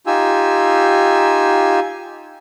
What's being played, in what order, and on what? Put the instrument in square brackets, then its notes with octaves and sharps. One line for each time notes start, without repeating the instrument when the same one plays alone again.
[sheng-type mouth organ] D#4 F4 G4 G#5 E6